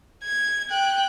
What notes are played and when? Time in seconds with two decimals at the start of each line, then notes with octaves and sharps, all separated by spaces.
0.24 G#6
0.71 G5 F#6